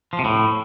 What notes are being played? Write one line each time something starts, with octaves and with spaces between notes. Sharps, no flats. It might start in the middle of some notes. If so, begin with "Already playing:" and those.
F3
C3
A2